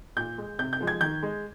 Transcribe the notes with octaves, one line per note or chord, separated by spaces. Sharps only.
A#2 G6
G#3
C3 G6
G6
F3 G#3
G#6
D#3 G6
G#3